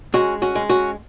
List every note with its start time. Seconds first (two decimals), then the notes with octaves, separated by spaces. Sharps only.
0.14 G#3 C#4 F#4
0.42 C#4 F#4
0.55 G#3
0.69 C#4 F#4